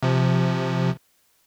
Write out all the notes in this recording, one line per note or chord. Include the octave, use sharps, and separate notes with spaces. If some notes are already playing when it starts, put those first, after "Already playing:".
C3 F3